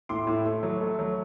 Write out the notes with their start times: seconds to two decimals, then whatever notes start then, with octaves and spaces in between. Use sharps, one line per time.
0.09 A2 C6 D6
0.27 A2
0.45 A3
0.63 F#3
0.81 A3
0.99 F#3